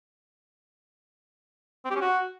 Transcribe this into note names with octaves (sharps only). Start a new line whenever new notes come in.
C4
G4
C#4
F#4